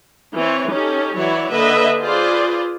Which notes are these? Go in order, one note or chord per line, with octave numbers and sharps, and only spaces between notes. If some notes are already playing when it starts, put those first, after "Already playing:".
E3 C4 C#5
C#4 D#4 G4 A4
E3 F#3 E4 C#5 D5
D3 A#3 B4 D#5 E5
F4 G#4 B4 C5 D5